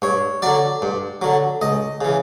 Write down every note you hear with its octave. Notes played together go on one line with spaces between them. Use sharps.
G2 C#5
D3 F#3 D5
G2
D3 F#3
C#2 D#5
C#3 E3